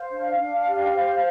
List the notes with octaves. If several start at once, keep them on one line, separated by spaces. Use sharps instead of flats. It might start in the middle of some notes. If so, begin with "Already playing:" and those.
Already playing: C5 F5
D4
D4
G4
C5